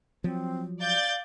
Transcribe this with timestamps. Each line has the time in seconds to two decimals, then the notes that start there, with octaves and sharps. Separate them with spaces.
0.24 F3 F#3 C4
0.81 D5 F5 G6 A6